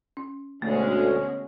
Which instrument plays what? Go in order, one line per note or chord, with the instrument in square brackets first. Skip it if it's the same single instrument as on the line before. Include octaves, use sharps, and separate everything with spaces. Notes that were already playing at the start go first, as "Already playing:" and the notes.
[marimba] C#4
[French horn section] D2 [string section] B2 D3 G#3 [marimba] A3 [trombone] C#4